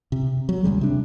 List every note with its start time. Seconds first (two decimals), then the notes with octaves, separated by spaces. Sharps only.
0.12 C3
0.49 F#3
0.64 D#2 C#3 G3 G#3
0.81 C3 D4